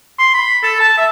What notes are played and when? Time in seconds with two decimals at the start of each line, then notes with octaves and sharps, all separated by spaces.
0.19 C6
0.34 B5
0.63 A4
0.80 A5
0.97 E5